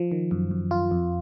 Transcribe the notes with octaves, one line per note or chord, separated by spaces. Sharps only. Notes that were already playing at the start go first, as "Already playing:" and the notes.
Already playing: F3
D#3
F#2
F#2
F4
F2